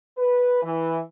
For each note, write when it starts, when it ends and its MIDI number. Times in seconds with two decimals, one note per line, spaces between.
0.18 0.60 71
0.63 0.99 52